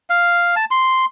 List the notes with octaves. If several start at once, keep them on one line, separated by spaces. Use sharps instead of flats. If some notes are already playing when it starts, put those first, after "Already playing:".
F5
A5
C6